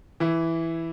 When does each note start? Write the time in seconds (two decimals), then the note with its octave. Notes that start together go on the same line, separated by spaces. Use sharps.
0.20 E3 E4